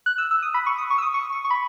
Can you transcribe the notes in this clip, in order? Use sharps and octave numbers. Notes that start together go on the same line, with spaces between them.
F#6
E6
E6
D#6
B5
C#6
D#6
C#6
E6
D#6
C#6
C#6
C#6
B5